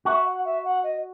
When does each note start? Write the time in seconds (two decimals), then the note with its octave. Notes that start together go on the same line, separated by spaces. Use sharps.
0.05 F#4 E5
0.25 F#5
0.44 E5
0.64 F#5
0.83 D#5